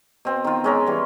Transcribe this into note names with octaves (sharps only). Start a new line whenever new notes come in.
B2 C4
D#3 F4
G#3 C#4 A#4
E3 G3